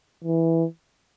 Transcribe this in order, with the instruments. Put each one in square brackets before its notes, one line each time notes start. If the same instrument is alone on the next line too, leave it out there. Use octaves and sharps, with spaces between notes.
[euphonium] E3